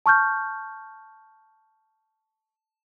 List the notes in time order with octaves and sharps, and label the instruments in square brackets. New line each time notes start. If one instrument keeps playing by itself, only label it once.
[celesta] A5 C#6 F6 G6